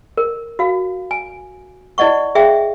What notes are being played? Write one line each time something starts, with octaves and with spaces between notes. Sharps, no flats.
A#4
F#4 F5
G#5
E4 D5 D#5 F#5 C#6
G#4 E5 F5 G5